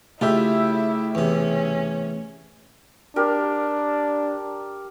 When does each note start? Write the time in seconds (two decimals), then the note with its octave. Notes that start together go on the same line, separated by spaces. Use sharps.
0.21 C#3 A3 E4 F4 G4 E5
1.15 E2 C3 C#4
3.16 D4 G4 A#4